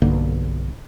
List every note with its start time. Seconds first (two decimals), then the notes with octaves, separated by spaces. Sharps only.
0.02 B1 G2 D3 A#3